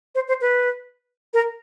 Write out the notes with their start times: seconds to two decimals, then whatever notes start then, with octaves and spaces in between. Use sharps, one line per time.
0.15 C5
0.28 C5
0.41 B4
1.34 A#4